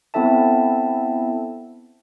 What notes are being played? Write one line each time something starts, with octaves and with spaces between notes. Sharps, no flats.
B3 C4 E4 A4 E5 A5